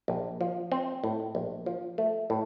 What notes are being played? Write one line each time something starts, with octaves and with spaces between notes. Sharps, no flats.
A#1
F3
C4
A2
A#1
F3
A3
A2